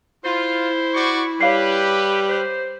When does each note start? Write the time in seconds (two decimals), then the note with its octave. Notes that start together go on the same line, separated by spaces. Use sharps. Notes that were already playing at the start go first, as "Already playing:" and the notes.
0.24 E4 F4 C5
0.94 F#4 D5 C#6
1.41 G3 G4 B4 C#5 F5 C7
2.29 C5